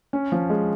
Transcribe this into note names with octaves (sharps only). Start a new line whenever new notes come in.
C#4
F3
G#3